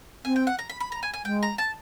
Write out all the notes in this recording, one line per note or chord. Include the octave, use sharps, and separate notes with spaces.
C4 G#5
G5
F#5
A#5
B5
B5
A#5
G#5
G#5
G#3 G5
A#5
A5